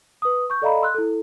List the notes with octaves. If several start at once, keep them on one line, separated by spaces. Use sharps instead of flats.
B4 D#6
C#6 G6
A4 D5 D#5 F5 A#5 B5
C6 E6 F#6
E4 A4